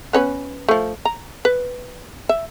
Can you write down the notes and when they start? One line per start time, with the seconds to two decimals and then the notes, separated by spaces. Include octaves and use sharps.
0.13 B3 C#4 B4
0.68 F3 A3
1.05 A#5
1.45 B4
2.29 E5